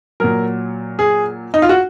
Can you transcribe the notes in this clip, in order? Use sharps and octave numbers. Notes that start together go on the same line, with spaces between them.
A#2 F#3 A#4
G#4
D#4
F4
F#4